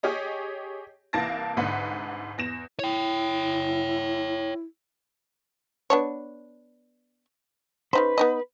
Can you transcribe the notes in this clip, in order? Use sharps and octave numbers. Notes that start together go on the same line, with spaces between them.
G4 G#4 C#5 D#5
C2 E3 A#3 A5 A6 A#6
C2 G#2 D3 B4 F#5 B6
E2 A#6 E7
E4 C#5 G5
B3 D4 C#5
C#3 D#4 B4 C5
B3 D#4 D#5